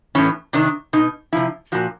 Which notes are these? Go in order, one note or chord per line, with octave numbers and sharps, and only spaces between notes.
A2 E3 C#4
C3 D#3 D4
B2 D#4
C3 F3 E4
A#2 F3 F#4